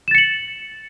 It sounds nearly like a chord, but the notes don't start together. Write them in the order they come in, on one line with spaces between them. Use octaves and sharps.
E7 A6 C#7 F#7